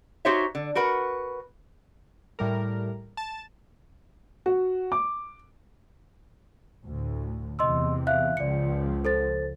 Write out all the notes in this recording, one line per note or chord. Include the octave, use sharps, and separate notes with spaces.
D#4 F#4 G4 C5 C#5 E5
D3
F#4 A#4 B4 F#5
A2 G3 A#4
A5
F#4
D6
D2 A2
E2 C3 D#5 C6 E6
E5 F5 F#6
C#2 F3 D5 C#7
A4 C5 A6